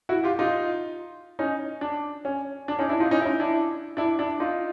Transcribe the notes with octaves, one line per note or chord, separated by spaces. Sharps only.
E4 F#4
F4 G4
D#4 F4
C#4 D#4
D4
C#4
D4
C#4 D#4
D4 E4
D#4 F4
C#4 D#4
E4
C#4 D#4
D4 E4
D4 E4
D4 E4
D#4 F4